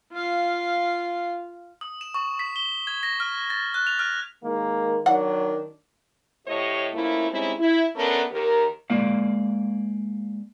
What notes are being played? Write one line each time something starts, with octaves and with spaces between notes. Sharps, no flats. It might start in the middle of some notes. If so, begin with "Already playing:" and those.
F4 F5
D#6
E7
C#6
B6
G7
G#6
A#6
F6
A6
F#6
F7
F6
D#3 G#3 A#3
D#3 F#3 D4 F#5
D2 A2 G4 C#5 D#5
F3 A3 A#3 C#4 E4
G3 G#3 C4 C#4 D#4 E4
E4
A3 B3 C#4 D4 A4 A#4
D#2 D#3 G4 A#4
G#3 A#3 D5 F5